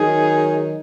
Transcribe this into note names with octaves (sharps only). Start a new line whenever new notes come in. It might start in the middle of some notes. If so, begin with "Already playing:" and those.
Already playing: D#3 F#3 D#4 G#4